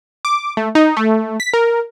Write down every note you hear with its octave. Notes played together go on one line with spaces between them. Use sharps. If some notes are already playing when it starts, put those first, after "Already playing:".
D6
A3
D#4
A3
B6
A#4